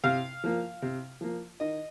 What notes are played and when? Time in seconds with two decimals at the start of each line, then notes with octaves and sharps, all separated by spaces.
0.04 C3 F5
0.44 F3 A#3
0.82 C3
1.21 F3 A#3
1.60 D#3 D#5